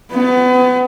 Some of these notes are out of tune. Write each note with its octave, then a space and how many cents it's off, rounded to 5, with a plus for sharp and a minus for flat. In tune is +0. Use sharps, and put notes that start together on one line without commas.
B3 +30